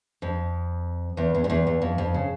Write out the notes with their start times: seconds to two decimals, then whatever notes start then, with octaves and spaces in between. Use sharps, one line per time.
0.22 F2
1.17 E2
1.35 E2
1.44 F2
1.50 E2
1.67 E2
1.82 F2
1.98 F2
2.14 C#3